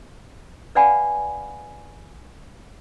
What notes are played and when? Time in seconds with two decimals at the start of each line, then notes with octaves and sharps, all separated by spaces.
0.75 B4 D5 F5 F#5 G#5 B5